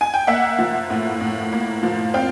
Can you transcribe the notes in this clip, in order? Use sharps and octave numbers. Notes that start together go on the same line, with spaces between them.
G#5
G5
A#3 E5 F#5
F3
A2
A2
A#3
F3
C4 F5 G5